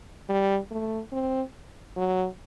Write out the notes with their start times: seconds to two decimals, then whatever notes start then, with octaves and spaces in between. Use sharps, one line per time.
0.29 G3
0.71 A3
1.12 C4
1.97 F#3